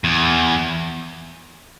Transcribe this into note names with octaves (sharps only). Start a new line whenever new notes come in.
E2